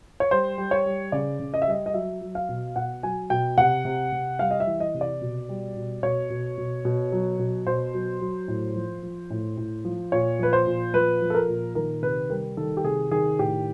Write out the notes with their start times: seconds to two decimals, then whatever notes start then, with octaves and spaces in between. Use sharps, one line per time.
0.20 C#5
0.31 G3 C5
0.58 G3
0.71 C#5
0.86 G3
1.12 C#3 D5
1.40 C#3
1.54 D#5
1.62 E5
1.67 G3 D#5
1.86 D#5
1.94 F#3 E5
2.21 F#3
2.35 F5
2.49 B2
2.76 B2 F#5
3.03 F#3 G#5
3.30 B2 G5
3.58 C3 F#5
3.85 C3
4.12 C3
4.39 G3 F5
4.51 D#5
4.60 E5
4.67 E3
4.80 D#5
4.94 C3
5.01 D5
5.22 B2
5.49 G3
5.76 B2
6.03 B2 C#5
6.30 B2
6.58 B2
6.85 B2
7.12 F#3
7.39 B2
7.67 B2 C5
7.94 F#3
8.21 F#3
8.48 A2
8.76 F3
9.03 F3
9.30 A2
9.57 A2
9.85 F3
10.12 A#2 C#5
10.39 F3 B4
10.53 C5
10.67 A#2
10.94 F3 B4
11.22 F3
11.30 A4
11.35 A#4
11.48 A#2
11.75 D#3 A#4
12.02 C3 B4
12.30 G3 A#4
12.57 D#3 A4
12.77 G4
12.84 C3 G#4
13.11 D#3 G#4
13.39 A2 G4